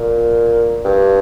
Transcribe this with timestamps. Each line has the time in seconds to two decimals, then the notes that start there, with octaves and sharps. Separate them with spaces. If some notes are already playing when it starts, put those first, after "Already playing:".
Already playing: A#2
0.85 G2